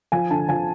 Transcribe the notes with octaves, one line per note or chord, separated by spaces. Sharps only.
F3 G#5
D3 A5
F3 G#5